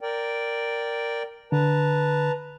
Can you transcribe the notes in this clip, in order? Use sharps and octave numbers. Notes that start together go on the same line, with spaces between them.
A#4 D5 G5
D3 B4 A5 A#5